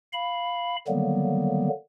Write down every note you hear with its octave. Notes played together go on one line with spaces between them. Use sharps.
F5 B5
D3 D#3 F#3 G3 A#3 B3